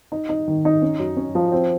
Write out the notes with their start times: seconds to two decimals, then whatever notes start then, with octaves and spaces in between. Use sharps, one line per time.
0.12 D#4
0.29 D#4
0.48 D#3
0.65 D#4
0.82 C#4
0.99 F#2
1.17 C#4
1.35 F3
1.52 C4